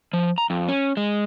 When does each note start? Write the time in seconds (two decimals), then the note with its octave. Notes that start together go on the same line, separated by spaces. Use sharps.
0.13 F3
0.38 A#5
0.50 F2
0.68 C#4
0.97 G#3